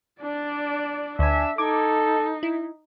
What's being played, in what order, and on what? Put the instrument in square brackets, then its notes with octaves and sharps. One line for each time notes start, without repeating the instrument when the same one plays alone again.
[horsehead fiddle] D4 D5
[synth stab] D2 G#5 [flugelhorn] D4 [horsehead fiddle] E5
[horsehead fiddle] D#4 [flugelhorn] A4 [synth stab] D6 G#6
[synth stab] E4